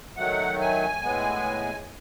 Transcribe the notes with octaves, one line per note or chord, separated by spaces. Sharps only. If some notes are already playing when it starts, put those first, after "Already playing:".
D#3 F#3 A3 F#5
G#5
A2 G#3 B3